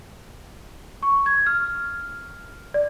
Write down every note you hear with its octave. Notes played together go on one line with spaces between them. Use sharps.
C#6
G#6
F6
D5